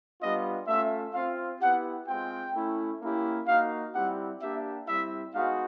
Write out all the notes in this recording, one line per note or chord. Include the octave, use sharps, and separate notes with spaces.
G3 B3 D4 F4 D#5
A3 C#4 F4 E5
C4 F4 F5
B3 E4 G4 F#5
G#3 C4 F4 G5
A3 C#4 E4
A#3 C#4 E4 G4
A#3 D#4 F#4 F5
G3 C4 E4 G4 F#5
A#3 D4 G4 E5
G3 C4 E4 E5
G#3 B3 D#4 F#4 F5